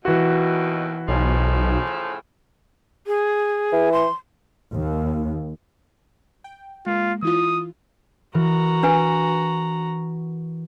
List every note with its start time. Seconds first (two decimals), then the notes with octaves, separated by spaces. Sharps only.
0.05 D#2 B2 E3 F#4
1.08 B1 A2 C#3 F3
3.07 G#4
3.73 E3
3.92 C6
4.74 D#2
6.44 G5
6.86 G#3 A#3 F4
7.23 E3 E4 F4 D#6
8.34 E3 F#4 A#4 A#5
8.83 D4 B4 G#5